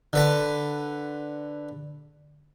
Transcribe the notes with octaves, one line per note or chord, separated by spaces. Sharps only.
D3 B4 A5